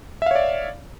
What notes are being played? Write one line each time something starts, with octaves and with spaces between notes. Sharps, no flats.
C#5 D5 E5 F5